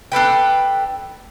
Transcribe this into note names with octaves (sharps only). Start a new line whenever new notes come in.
D4 A4 B4 G5